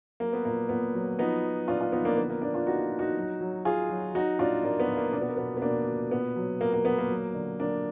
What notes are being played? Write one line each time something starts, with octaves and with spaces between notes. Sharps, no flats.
F#3 A#3
B3
A#2 A#3
A#2 B3
F#3
F3 B3 D#4
F3
A#2 D4 F4
D4 F4
F3 B3 D#4
A#3 D4
D3 B3
A#3
F3 A#3 D4
D4 F4
F3 D#4 F#4
F3
D#4 F#4
F#3
F#3
F#3 F4 G#4
F#3
F#3 D#4 F#4
A#2 D4 F4
A#2 A#3 D4
B3
A#2
A#3
B2 D4
B3
A#3
B2 B3
B3
B2 A#3 D4
B2
A#2 B3
F#3
A#2 A#3
A#3
F#3 B3
A#3
F#3
D3
D3 A#3 D4